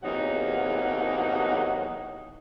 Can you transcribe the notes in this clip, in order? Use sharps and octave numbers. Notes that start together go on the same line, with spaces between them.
E2 C3 F#3 A#3 D#4 F#5